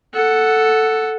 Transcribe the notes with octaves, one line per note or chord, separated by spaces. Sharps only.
A4 F#5